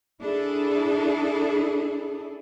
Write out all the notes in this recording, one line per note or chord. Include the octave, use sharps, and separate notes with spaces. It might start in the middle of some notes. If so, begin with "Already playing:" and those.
D4 E4 G#4 A4